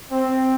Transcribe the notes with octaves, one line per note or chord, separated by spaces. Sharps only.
C4